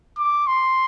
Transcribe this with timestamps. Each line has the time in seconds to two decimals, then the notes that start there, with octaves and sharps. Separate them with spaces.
0.18 D6
0.47 C6